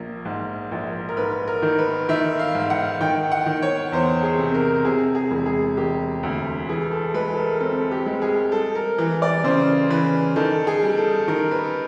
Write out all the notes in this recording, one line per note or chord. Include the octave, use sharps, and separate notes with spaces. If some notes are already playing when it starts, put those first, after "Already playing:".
Already playing: A#1 A#3
G#2
A#1
A#4
G#2 B4
A#4
D#3
B4
D#3 E5
F5
G#2
F#5
D#3 G5
F#5
D#3
C#5
E2 C5
G#4
C3
A#4
C3 G#4
G#4
E1
G#4
E1 G4
D2
E3 G#4
A4
G#3 B4
A4
A#4
C4 A4
G4
G#3
G#4
G3 A4
A#4
E3
D5
C#3 C5
E3 B4
D#3 A4
G#4
G3
A4
D#3 A#4
B4